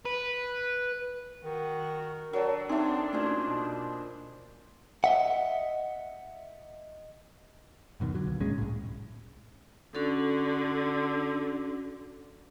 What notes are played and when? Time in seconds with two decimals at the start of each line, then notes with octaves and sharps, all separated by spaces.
0.06 B4
1.44 D#3 F#4
2.33 F#3 D4 A4 A#4 C#5 D5
2.69 C4 D#4 G#4 A4 E5
3.13 A#2 A3 C#4 F#4 C5 D#5
3.47 B2
5.04 D#5 E5 F#5
8.00 D1 F#2 B2 D#3
8.14 D3 F#3
8.27 C#2
8.41 E1 A#2 G#3 C#4
8.58 C2 A2
9.95 D3 C#4 F#4 A4